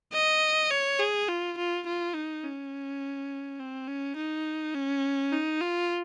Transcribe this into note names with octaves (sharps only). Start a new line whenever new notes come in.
D#5
C#5
G#4
F4
F4
F4
D#4
C#4
C4
C#4
D#4
C#4
D#4
F4